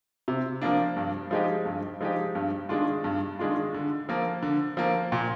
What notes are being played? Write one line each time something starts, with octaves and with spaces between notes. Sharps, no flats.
C3
F3 A#3 D4
G2
F3 G#3 D#4 G4
G2
F3 G#3 D#4 G4
G2
D#3 G#3 D4 F4
G2
D#3 G#3 D4 F4
D3
F3 A#3
D3
F3 A#3
A#2